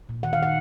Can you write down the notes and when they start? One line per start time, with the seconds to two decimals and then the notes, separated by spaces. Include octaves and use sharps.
0.09 A#2
0.23 D#3 F#5
0.33 F5
0.38 D#3 F#5